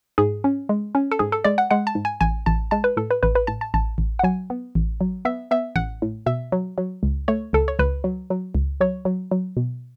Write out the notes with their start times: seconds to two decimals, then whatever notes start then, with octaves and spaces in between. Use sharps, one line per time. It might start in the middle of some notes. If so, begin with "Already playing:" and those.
0.18 G#2 G#4
0.44 C#4
0.69 G#3
0.95 C#4
1.11 A4
1.19 G#2 G#4
1.32 A4
1.44 G#3 D5
1.58 F#5
1.71 G#3 F#5
1.87 A5
1.95 G#2
2.05 G#5
2.21 A1 G#5
2.46 A1 A5
2.71 G#3 A5
2.84 B4
2.97 A2 A4
3.11 B4
3.23 A1 B4
3.35 B4
3.47 A2 A5
3.61 A5
3.74 A1 A5
3.98 A1
4.19 F#5
4.23 F#3 G#5
4.50 B3
4.75 A1
5.01 F#3
5.25 B3 E5
5.51 B3 E5
5.76 A1 F#5
6.02 A2
6.26 B2 E5
6.52 F#3
6.78 F#3
7.03 C#2
7.28 A3 C#5
7.53 C#2 A4
7.68 C#5
7.79 C#2 B4
8.04 F#3
8.30 F#3
8.55 C#2
8.81 F#3 C#5
9.05 F#3
9.31 F#3
9.57 B2